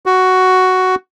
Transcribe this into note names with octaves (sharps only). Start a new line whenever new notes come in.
F#4